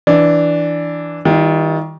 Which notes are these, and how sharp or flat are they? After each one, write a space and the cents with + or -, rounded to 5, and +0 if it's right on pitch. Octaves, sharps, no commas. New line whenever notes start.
E3 +0 D4 +0
D#3 +30 G3 +15 F4 -25